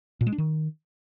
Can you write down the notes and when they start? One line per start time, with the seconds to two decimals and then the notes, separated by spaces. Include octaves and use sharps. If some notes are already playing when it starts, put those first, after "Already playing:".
0.21 A#2
0.27 G#3
0.32 D4
0.38 D#3